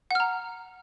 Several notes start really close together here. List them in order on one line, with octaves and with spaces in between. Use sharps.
F#5 F6 A#5